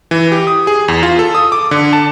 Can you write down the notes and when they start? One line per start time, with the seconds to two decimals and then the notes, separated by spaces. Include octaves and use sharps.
0.11 E3
0.32 G4
0.47 D#6
0.67 G#4
0.88 E2
1.03 F4
1.19 A4
1.35 D#6
1.52 D6
1.71 D3
1.93 A5